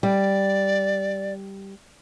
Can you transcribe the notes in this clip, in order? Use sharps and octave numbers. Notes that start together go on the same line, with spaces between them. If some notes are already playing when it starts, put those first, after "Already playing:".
G3 D5